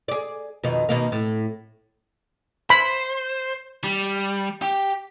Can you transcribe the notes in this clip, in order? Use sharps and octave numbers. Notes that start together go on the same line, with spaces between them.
G#4 D5
F2 B2 D#3
B2 D#3 A#3
A2
C5 B5
G3
G4